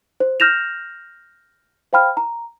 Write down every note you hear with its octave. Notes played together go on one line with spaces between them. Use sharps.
C5
F6 G6 A#6 E7 F7
C5 F5 G5 B5 F6
A#5